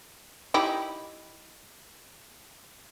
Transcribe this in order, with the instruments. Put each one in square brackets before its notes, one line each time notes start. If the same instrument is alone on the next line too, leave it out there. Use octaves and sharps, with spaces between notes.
[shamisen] D#4 E4 G4